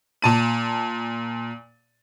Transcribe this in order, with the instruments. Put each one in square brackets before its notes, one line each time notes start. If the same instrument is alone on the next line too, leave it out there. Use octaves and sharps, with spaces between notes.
[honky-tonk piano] A#2 A5 D#7